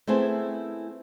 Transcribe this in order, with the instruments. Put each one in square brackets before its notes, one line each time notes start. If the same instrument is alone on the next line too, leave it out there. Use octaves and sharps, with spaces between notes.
[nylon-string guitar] A3 B3 C4 E4 G#4 G#5